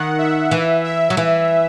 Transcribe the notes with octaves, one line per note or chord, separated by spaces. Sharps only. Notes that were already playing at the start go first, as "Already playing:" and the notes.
Already playing: D#3 F#5
E5
E3
E5
F#3
E3